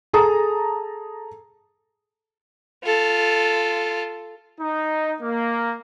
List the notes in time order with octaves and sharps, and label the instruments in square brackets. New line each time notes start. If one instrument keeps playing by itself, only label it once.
[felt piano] G#4 A4 A5 A#5 D#6
[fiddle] F4 A4
[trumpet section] D#4
A#3